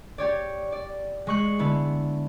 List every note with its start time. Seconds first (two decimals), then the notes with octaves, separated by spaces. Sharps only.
0.18 G4 C#5 D5
0.72 D5
1.27 G#3 C#6 F#6
1.59 D3 B3 E4